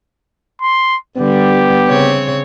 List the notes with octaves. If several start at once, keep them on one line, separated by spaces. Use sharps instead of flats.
C6
D3 G3 B3 G4
C#3 C4 C#5